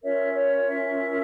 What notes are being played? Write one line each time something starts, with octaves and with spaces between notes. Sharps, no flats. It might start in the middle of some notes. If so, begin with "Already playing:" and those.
C#4 F4 A#4 C#5 E5
C#5
E5